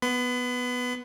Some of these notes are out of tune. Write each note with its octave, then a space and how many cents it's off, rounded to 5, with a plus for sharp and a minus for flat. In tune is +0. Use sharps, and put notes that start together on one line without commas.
B3 +0 B5 +35